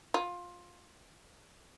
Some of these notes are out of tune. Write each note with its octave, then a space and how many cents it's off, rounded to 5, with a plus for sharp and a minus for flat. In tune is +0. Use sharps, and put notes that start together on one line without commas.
F4 +15